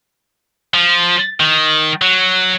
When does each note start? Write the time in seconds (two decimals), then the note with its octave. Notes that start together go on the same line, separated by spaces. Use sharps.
0.74 F3
1.40 D#3
2.02 F#3